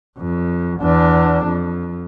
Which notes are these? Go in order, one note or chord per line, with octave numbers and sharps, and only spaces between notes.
F2
E2 D4
F2